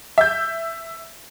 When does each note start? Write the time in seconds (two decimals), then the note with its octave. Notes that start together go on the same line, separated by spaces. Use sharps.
0.18 E5 G6